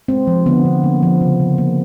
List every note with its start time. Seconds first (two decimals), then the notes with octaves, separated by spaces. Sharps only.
0.08 G#3 C4
0.27 F3
0.46 D3 B3
0.65 D3
0.83 A#3
1.03 F3
1.21 C#3
1.40 C#3
1.58 A#3